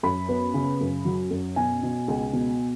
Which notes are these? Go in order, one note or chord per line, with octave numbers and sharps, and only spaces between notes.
F#2 B5
B3
C#3
F#2
F#3
F#2
B2 G#5
B2
C#2
B2